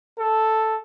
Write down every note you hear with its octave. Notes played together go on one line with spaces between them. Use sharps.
A4